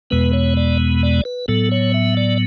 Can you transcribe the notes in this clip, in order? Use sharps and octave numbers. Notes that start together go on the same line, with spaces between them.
E2 B2 G#3 B3 B4
C#5
D5
D5
B4
A2 F#3 B3 A4
C#5
E5
D5